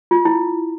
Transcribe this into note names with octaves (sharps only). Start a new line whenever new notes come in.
F4
E4